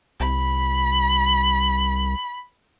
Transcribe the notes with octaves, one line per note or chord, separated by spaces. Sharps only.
C2 B5